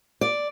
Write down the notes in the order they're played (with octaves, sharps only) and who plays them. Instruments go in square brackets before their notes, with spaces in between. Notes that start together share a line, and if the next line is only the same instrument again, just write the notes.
[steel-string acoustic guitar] D5